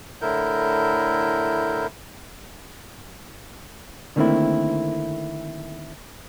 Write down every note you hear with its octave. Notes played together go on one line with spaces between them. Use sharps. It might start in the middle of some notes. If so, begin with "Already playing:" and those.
A2 D3 E4 A#4 G6
D3 D#3 A3 A#3 C4 E4